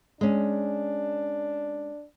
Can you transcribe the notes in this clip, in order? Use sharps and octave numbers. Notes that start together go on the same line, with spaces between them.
G#3 C#4 D4